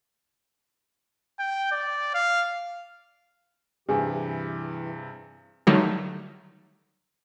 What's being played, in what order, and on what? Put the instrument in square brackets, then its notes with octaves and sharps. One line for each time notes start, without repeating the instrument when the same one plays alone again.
[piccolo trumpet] G5
D5
F5
[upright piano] G2 C3 [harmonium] E3 G4 [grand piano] G#4
[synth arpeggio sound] D3 D#3 F#3 G3 A3 D#4